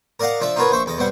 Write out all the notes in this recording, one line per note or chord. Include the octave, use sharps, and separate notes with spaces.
A#4 D5 D#5 F5 F#5
F3 D4 D5 E5
D#4 F4 F#4 A#4 B4 C#5
A#1 C5 E5 C#6
E2 A4 D#5
B2 G3 C4 F#5